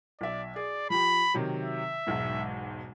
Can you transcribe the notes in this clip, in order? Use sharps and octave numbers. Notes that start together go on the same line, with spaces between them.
B1 D5 E5
G#4 D5
F3 G4 B5
C3 D#3 F#3
E5
E1 B1 G#2